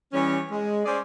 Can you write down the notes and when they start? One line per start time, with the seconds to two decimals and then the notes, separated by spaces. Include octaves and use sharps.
0.13 E3 G3 C#4
0.51 G#3
0.85 C#4 G#4 C5 D5